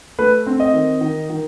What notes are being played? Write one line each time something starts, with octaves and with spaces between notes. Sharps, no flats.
A3 B4
C4
D#5
D#3
D#3
D#3